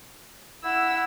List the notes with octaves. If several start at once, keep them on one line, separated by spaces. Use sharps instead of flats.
E4 F#5 E6